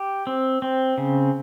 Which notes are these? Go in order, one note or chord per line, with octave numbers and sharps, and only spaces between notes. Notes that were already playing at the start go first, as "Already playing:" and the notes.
Already playing: G4
C4
C4
C#3